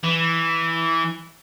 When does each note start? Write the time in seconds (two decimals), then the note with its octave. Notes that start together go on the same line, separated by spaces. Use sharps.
0.04 E3